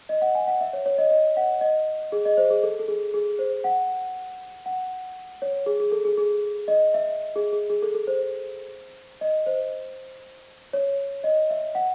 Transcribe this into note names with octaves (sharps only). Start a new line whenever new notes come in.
D#5
F#5
G#5
F#5
E5
C#5
C#5
D#5
D#5
F#5
D#5
G#4
D#5
C5
G#4
A4
A4
G#4
G#4
C5
F#5
F#5
C#5
G#4
G#4
A4
G#4
G#4
D#5
E5
G#4
G#4
G#4
A4
A4
C5
D#5
C5
C#5
D#5
E5
F#5